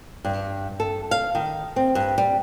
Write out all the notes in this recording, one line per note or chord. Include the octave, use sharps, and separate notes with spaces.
G2
A4
F5
D#3
C4
G2
G3